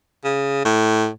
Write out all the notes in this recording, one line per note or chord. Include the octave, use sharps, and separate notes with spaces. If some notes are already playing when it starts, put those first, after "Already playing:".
C#3
A2